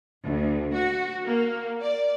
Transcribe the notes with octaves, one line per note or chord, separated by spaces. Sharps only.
D2
F#4
A#3
D5